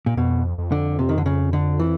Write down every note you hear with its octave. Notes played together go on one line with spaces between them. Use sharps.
A#2
F2 B2
F2
D3
C3
D#3
D3
C#3
D3
E3